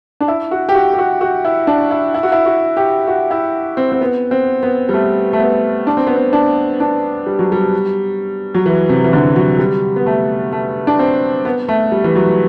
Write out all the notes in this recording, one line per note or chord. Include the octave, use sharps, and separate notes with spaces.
D4
E4
F#4
G4
F#4
G4
F#4
F#4
E4
D4
E4
E4
F#4
E4
F#4
G4
F#4
E4
C4
C4
B3
C4
B3
G3
A3
A3
B3
D4
C4
B3
C4
D4
D4
G3
F#3
G3
F#3
E3
C3
E3
D3
F#3
G3
B3
A3
A3
D4
C4
B3
A3
G3
E3
F#3